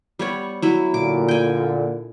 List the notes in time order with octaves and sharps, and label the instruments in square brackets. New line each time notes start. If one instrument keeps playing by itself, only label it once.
[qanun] G3 B3 C#5
F#3 E4
[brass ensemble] A#2 D3 [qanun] D6
[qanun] G5 G#5